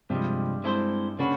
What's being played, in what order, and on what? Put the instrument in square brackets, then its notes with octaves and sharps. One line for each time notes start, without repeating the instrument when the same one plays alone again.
[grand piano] G2 G3 [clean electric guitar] C3 F3 G#3
[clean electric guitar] G#3 C4 E4 A4 C5
[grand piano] C#3 C#4 [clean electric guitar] A#3 D4 F#4 B4